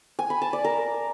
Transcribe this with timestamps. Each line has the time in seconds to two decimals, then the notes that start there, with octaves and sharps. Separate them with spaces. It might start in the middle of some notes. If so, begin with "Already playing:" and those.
0.19 G#5
0.30 B5
0.42 A5
0.53 D5
0.64 A#4